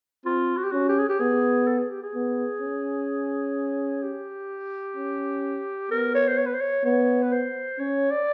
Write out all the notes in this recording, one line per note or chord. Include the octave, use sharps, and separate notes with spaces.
C4 F4
F#4
G4
C#4 F#4
G4
G#4
G4
B3 G#4
A4
G#4
G4
G#4
B3
C#4
G4
C#4
B3 A#4
C#5
C5
C#5
B4
C5
C#5
B3 C#5
B4
C5
C#4 C#5
D5